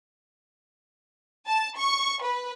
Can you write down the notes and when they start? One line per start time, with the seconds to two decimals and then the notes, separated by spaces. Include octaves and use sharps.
1.48 A5
1.77 C#6
2.23 B4